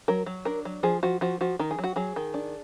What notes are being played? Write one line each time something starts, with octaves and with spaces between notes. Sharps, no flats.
F#3 A#4
F#3
D4 A#4
F#3
F3 G#4
F3 F#4
F3 F#4
F3 F#4
D#3 A#4
G#4
F#3
F#4
F#3 G#4
D#3
D4